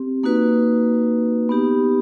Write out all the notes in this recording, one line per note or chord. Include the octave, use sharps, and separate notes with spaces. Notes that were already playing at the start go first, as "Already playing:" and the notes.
Already playing: C4 G4
A#3 D#4 F#4 B4
B3 D#4 G4